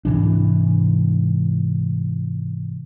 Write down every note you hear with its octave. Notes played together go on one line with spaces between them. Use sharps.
G#2 C3 E3 D4